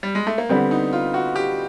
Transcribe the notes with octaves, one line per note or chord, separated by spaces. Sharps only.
G3
G#3
A3
A#3
D3 G3 B3 C4
D#4
F4
F#4
G4